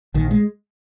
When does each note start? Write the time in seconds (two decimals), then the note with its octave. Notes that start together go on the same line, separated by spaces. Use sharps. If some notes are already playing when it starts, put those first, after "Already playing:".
0.14 A#1 D#3
0.31 G#3